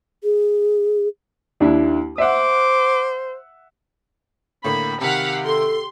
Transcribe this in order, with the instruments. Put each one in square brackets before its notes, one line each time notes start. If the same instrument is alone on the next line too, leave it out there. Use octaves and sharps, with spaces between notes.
[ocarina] G#4
[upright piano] D#2 D4 E4
[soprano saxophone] C5 [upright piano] E5 F#5 [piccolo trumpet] D6
[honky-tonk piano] A2 D3 A#3 [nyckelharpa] B5
[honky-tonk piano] C3 D#3 [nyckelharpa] G4 [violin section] F5 F#5 B6
[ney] A4 [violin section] C6